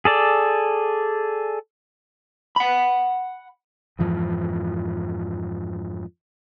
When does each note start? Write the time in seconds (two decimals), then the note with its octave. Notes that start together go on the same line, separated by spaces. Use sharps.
0.05 G#4 A4 D5
2.56 F#5 B5
3.99 F2 G#2 E3 F3